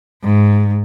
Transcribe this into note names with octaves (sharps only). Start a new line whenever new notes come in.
G#2